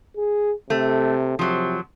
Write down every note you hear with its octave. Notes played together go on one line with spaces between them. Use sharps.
G#4
C3 A3
C3 F3 F#3